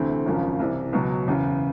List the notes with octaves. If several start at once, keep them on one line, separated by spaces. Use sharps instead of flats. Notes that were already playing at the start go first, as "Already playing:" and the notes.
Already playing: D2 C3 E3 A3 C4
G#1 F#2 C#3 F3
C2 C3 E3
C#2 B2 F#3
F#1 E2 C#3